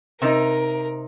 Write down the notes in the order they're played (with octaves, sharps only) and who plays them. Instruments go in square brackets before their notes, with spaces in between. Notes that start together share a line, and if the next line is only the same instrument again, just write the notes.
[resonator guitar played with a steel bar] C3 D#4 [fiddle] A#4